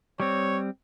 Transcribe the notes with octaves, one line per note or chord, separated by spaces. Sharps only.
G3 C4 C#5